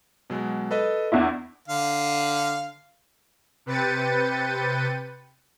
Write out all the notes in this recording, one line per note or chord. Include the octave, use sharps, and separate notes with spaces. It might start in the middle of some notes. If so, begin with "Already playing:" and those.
B2 F#3 G#3
A4 B4 D#5
E2 D4 E4
D3 F5
C3 B4 G5 A6 C#7 D#7